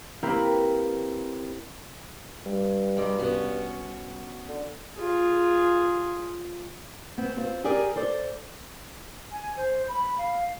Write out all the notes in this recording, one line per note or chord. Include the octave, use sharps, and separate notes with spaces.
A#3 C4 E4 G4 A#4 B4
G2 G3
C3 G3 G#4 D#5 D6
C2 B3 C#4 F#4
D3
F4 G#4
B3 C4
C4 F4
G4 G#4 A#4 D5
A4 C5 D5
G#5
C5
B5
F5